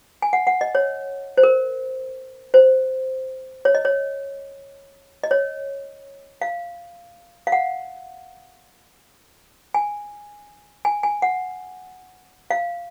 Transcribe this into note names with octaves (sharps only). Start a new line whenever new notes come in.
G#5
F#5
F#5
D#5
C#5
C5
A#4
C5
C#5
D#5
C#5
D#5
C#5
F5
F5
F#5
G#5
G#5
G#5
F#5
F5